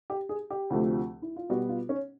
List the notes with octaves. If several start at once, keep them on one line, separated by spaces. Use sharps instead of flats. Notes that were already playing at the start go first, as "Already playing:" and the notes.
G4
G#4
G4
D2 C3 F3 A3
E4
F4
B2 G3 B3 F#4
F4
C#4